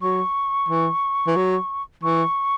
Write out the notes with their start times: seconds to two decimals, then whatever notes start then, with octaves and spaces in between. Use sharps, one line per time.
0.01 F#3 C#6
0.68 E3
1.27 E3
1.36 F#3
2.03 E3 C#6